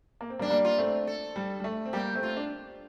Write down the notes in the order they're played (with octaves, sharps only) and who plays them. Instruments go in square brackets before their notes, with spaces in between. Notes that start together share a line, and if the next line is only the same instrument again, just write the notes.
[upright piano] A#3
C4
G3 A#3
[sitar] D4
[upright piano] G3 A#3
[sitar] F4
[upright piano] A3 C4
[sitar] A4
[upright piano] G3
G3
A3
C4
[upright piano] G3 A#3 [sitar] G4
[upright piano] A3 C4
[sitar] F4
[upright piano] D4